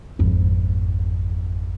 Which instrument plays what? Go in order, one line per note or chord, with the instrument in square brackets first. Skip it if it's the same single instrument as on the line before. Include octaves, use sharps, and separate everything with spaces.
[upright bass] G#1 F2